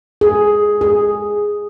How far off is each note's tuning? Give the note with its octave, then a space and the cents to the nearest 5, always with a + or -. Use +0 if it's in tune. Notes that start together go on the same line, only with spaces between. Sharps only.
G#4 +5
G#4 -5